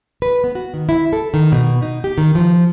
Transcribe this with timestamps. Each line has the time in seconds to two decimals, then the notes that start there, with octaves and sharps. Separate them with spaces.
0.22 B4
0.44 B3
0.55 F#4
0.74 D#3
0.89 E4
1.13 A4
1.34 D#3
1.52 B2
1.82 D#4
2.04 G4
2.18 D#3
2.35 F3